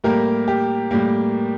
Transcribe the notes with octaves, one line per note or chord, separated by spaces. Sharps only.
A2 G3 A#3 G4 A#4
G4
A2 G3 A#3